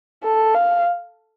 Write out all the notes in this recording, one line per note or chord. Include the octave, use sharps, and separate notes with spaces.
A4
F5